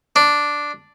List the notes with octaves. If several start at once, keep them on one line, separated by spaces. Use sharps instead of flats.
D4